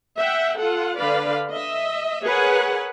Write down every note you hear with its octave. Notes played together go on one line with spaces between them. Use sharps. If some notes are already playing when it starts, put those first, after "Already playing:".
E5 F#5 G5
F4 A4 F#5
D3 B4 D5 F5 B5
D#5 E5
G#4 A#4 B4 C#5 F#5 G#5